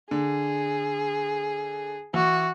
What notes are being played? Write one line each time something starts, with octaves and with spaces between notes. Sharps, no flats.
D3 G#4
E3 F#4